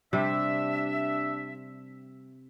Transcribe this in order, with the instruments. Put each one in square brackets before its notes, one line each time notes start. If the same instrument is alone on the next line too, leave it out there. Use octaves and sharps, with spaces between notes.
[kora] C3 G3 [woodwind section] D4 E5